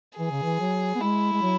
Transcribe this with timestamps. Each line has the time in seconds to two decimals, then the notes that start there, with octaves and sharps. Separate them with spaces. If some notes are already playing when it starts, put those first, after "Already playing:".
0.19 E3 G#4
0.31 C#3
0.42 E3
0.60 F#3
0.95 B3
1.01 G#3 E4
1.33 G#3
1.42 F#3